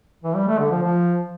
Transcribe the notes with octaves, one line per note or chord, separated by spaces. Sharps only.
E3
G3
A3
D3
F3
F3